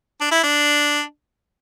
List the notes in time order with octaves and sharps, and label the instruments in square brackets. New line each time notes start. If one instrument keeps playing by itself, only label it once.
[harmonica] D4
E4
D4